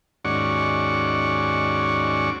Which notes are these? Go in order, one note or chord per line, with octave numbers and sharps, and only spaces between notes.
D#2 G#2 C#4 F#4 D5 C#6